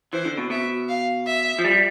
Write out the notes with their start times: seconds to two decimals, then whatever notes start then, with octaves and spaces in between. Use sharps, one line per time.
0.13 E3 C5
0.25 D3
0.38 B2
0.50 B2 E5
0.88 F5
1.27 E5
1.59 F3
1.65 G3